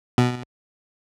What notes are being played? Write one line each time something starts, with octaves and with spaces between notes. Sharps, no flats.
B2